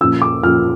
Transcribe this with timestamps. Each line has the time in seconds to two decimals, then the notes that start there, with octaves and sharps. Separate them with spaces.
0.01 A#2 F3 C#4 E6
0.22 D6
0.43 A#2 F3 C#4 F6